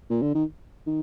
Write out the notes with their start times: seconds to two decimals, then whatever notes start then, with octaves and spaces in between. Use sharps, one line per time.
0.10 A#2
0.22 D3
0.35 D#3
0.87 D#3